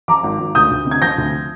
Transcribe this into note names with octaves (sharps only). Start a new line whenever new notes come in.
F3 A#5 D6
G#1
G#1
D2 D#6 G6
D2
C3
G#6
F3 G6 A#6
D2